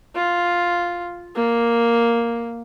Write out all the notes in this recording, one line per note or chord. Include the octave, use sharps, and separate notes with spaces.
F4
A#3